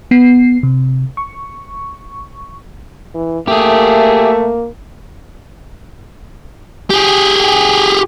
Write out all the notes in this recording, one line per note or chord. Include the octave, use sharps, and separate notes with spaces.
B3 C7
C3
C#6
E3
A3 A#3 G4 G#4 E5
G4 G#4